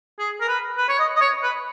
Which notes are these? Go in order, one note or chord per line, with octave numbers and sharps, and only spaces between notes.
G#4
A#4
B4
B4
C#5
D#5
D#5
C#5
B4